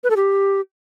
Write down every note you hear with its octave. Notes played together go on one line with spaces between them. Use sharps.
B4
A4
G4